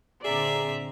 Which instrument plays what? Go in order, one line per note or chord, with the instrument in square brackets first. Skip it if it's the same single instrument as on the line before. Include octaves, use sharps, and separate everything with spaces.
[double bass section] A#2 D3 C4 [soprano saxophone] G#4 [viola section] D5 A#5 [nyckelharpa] E5